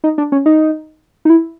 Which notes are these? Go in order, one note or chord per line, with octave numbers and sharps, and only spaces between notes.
D#4
D4
C#4
D#4
D#4
E4